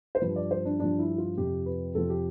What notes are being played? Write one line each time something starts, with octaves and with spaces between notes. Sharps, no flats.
C5
G2 F3 B4
D5
C5
D4
G2 F3 D4
E4
F4
F2 C3 F3 G4
B4
F2 C3 F3 A4
G4